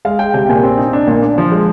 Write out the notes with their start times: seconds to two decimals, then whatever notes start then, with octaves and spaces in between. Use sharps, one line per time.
0.05 G#3 F5
0.19 G#3 G5
0.34 C3 G5
0.49 A#2 G#5
0.63 C4
0.78 D#4
0.93 D4
1.08 A#2
1.22 D4
1.38 F3
1.52 G#3